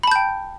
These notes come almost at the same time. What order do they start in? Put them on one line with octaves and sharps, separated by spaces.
B5 A5 G6 G5